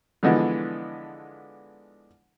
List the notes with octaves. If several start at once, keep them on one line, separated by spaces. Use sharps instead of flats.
D3 E3 F3 G#3 B3 D4